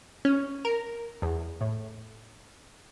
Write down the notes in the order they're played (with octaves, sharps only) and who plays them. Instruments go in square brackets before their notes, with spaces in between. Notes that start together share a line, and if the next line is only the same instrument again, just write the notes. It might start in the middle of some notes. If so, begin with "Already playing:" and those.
[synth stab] C#4
A#4
E2
A2